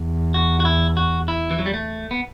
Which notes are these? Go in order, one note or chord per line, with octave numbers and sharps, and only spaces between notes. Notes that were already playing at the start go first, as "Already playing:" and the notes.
Already playing: E2
F#4
F#4
E4
F#4
E4
E3
F#3
G3
A3
B3